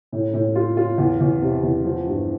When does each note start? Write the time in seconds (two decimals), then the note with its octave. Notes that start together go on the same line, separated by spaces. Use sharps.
0.12 A2
0.34 A2
0.55 F4
0.77 F4
0.98 E2
1.20 E2
1.42 C3
1.63 E2
1.85 F3
2.07 G2